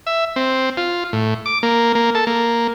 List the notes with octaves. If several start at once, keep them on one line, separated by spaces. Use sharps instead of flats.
E5
C4
F4
A2
D6
A#3
A#3
A4
A#3